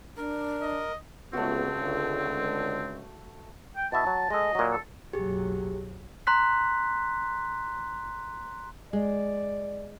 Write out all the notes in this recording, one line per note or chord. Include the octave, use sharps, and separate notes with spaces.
D4 A#4
D#5
C#2 A3 B3 C4 F#4
D3
G5
B2 E4 E5 A5
F#3
G#3 A4 D#5
A#2 F#3
A4
F#1 B1 F#3 G4 G#4
A#5 C6 F#6 B6
G#3 D5